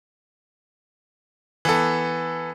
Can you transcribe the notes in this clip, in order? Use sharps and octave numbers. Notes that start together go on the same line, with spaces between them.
E3 B3 A4